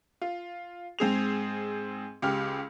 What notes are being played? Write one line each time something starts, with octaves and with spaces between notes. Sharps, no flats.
F4
G#2 C4 G#4 F7
C#2 G4 F6